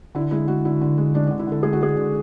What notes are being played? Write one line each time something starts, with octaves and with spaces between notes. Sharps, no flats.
D3 E4
G#3 E4
G#3 F#4
D3 E4
D3
G#3
G#3 D4
D4
D3
E4
D3 A4
G#3 G#4
F#4
G#3 G#4
D3